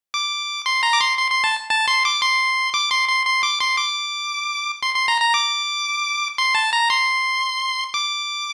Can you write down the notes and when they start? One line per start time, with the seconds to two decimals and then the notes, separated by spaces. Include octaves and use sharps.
0.14 D6
0.66 C6
0.83 A#5
0.93 D6
1.01 C6
1.18 C6
1.31 C6
1.44 A5
1.70 A5
1.88 C6
2.05 D6
2.22 C6
2.74 D6
2.91 C6
3.09 C6
3.26 C6
3.43 D6
3.60 C6
3.77 D6
4.83 C6
4.95 C6
5.08 A#5
5.21 A#5
5.34 D6
6.38 C6
6.55 A5
6.73 A#5
6.90 C6
7.94 D6